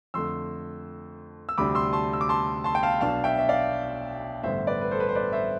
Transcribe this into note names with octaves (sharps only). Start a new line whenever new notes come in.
F2 D3 A3 C6 E6
E6
D2 C3 G3 D4 B5 D6
C6 E6
A5 C6
E6
D6
A5 C6
A5 C6
G5
F5 A5
B1 B2 B3 D4 F5 A5
E5 G5
E5
D5 F5
A1 G2 D3 G3 B3 C5 E5
B4 D5
B4
A4 C5
B4
C5
B4 D5
C5 E5